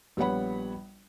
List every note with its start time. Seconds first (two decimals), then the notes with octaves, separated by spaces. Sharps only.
0.17 A#1 G3 B3 C#5 F#5 B5